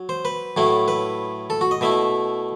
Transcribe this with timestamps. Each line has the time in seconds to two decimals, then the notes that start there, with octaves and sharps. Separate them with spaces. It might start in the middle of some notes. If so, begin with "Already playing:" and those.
Already playing: F#3
0.09 C5
0.25 B4
0.57 A2 F#3 A3 E4
0.88 B4
1.50 A4
1.61 F#4
1.71 D#5
1.81 B2 A3 E4 E5